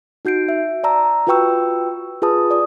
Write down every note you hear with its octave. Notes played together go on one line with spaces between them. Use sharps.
D#4 F#4 G6 C7 D7
E5
D5 A5 A#5 E6
F4 F#4 B4 G5 C#6 E6
F4 G#4 B4 A5 D#6
D5 D#6